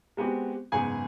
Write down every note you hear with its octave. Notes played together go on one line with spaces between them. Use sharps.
G#3 B3 C4 F#4 G4
F#1 G#2 B3 G#4 G#5